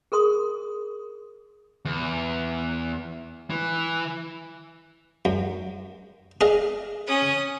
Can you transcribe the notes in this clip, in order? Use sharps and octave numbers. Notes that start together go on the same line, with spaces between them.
G#4 A#4 C6 D#6
E2
E3
F#2
G#4 D#5 F5
C#4 D#6